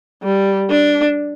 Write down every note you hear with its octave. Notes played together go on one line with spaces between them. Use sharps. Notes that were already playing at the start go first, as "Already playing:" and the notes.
G3
D4